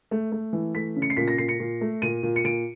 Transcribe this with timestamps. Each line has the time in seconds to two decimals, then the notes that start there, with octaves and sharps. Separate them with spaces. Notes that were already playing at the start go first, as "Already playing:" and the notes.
0.11 A3
0.32 A3
0.53 E3
0.74 A3 B6
0.96 C#3
1.02 C#7
1.10 C7
1.17 A#2 B6
1.28 A#6
1.38 A#2 C7
1.49 C#7
1.60 A#2
1.81 A3
2.02 A#2 D#7
2.23 A#2
2.36 C#7
2.44 A#2 D7